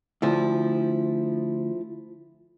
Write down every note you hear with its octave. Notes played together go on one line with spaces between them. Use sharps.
D2 F3 E4